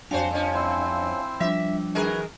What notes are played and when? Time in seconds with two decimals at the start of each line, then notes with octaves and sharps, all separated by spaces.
0.11 F2 F#3 D4 F#4 C5 F5 G#5 A5
0.30 G2 F3 C#4
0.54 C4 E4 C5
1.40 F3 G3 D4 E5
1.95 D#3 F#4 G#4 A#4 B4